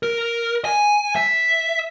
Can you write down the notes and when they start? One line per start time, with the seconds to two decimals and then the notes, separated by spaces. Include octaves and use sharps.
0.03 A#4
0.65 G#5
1.16 E5